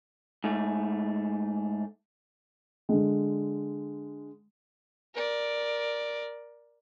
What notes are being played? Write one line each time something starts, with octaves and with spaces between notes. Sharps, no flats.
G#2 A3
D3 G#3
A#4 D5